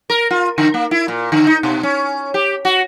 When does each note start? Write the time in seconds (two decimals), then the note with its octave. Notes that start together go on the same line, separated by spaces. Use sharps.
0.10 A#4
0.30 F4
0.58 D3
0.74 A#3
0.91 E4
1.08 A#2
1.32 D3
1.47 D#4
1.63 B2
1.83 C#4
2.34 G4
2.65 F#4